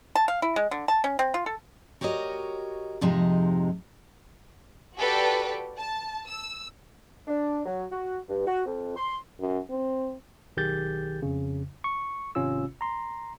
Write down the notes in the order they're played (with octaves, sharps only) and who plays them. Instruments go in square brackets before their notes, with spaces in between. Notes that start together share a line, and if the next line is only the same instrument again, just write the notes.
[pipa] A5
F5
E4
G#3
D3
A5
C#4
C4
F4
A4
[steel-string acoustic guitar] F#4 G4 A#4 C#5 D#5
F2 G#2 C3 F3 G#3 D#4
[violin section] F#4 G4 A4 B4 D5 G5
A5
E6
[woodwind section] D4
F#3
F#4
G2
F#4
F2
C6
[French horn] F#2
C4
[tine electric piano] B1 D#3 G4 G#4 G6 A6
F2 C#3
C#6
G#1 C3 C#4 F4 E6
A#5 C6